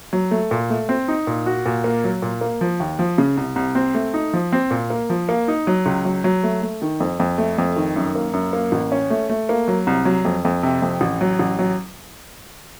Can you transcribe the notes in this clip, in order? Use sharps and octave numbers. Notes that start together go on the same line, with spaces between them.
F#3
A3
A#2
A3
C4
D#4
A#2
F#4
A#2
A#3
F#3
A#2
A#3
F3
D#2
F3
C#3
C2
C2
C4
A3
D#4
F3
C4
A#2
A#3
F3
A#3
D#4
F#3
C#2
F#3
F#3
A3
A3
D#3
F2
F2
A3
F2
D#3
F#2
A#3
F#2
A#3
A1
C#4
A3
A3
A#3
F#3
C2
F#3
F2
F2
C3
F2
A1
F#3
A1
F#3